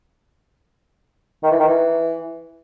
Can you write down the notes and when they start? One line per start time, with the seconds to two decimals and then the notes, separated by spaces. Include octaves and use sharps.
1.43 D#3
1.51 E3
1.60 D#3
1.68 E3